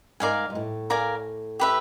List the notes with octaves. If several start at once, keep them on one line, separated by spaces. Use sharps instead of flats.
G#2 A#4 D5 F5 G#5
G#2
A2
A#4 D5 F5 G#5
G4 B4 E5